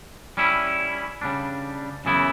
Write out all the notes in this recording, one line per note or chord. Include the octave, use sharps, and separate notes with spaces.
G3 C#4 E4
C#3 G3 D4
F#2 C#3 E3 B3 E4